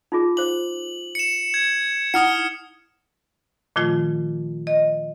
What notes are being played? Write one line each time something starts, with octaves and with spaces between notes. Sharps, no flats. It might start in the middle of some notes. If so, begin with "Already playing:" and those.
D#4 F4 G#4
C5 D6 F#7
C#7 E7
G#6
D#4 E4 F#5 D#6 F6 C#7
A#2 D#3 F3 A3 F4
D#5